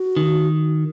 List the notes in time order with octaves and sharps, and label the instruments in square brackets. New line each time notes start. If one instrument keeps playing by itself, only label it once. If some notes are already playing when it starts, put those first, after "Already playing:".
Already playing: [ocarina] F#4
[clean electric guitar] D#3